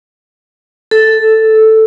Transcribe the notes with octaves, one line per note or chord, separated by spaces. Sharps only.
A4